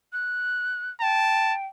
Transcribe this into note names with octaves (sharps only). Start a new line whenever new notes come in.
F#6
G5 A5